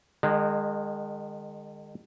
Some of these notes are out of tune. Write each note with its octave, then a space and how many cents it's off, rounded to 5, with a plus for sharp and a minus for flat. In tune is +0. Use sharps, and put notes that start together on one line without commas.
D#3 -45 G#3 -20